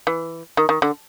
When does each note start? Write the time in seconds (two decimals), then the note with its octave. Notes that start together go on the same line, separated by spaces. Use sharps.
0.07 E3
0.57 D#3
0.69 D#3
0.82 D3